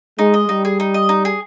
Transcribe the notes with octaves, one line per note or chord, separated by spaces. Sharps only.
G#3 D#4
D#5
G3 D#4
G#4
D#4
D#5
D#4
G#4